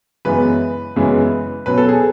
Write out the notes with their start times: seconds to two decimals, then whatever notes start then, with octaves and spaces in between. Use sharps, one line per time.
0.25 F#2 C#3 E3 G#3 B3 B4
0.96 F#2 C#3 E3 G#3 B3
1.66 B2 F#3 C#4 B4
1.78 A4
1.89 G#4